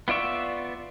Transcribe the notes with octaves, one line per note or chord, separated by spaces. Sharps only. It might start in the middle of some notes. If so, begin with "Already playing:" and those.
B3 F4 D5 E5 C#6